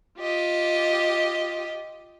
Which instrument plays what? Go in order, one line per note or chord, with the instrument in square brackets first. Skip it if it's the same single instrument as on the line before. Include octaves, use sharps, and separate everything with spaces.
[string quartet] F4 G4 D#5